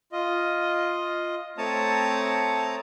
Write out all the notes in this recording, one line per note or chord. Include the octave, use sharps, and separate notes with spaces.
F4 D#5
A3 C4 C#5 A5 A#5 D#6